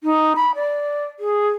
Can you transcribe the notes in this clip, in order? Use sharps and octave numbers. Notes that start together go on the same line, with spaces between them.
D#4
B5
D5
G#4